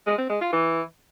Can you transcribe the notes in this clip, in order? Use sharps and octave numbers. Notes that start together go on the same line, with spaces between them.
G#3
C4
G#3
F4
E3